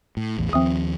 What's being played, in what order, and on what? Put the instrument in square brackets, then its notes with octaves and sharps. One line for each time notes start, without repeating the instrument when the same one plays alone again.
[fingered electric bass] A2
A1 E2 A2
[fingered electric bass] D#2 F3 [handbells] C4 E5 D#6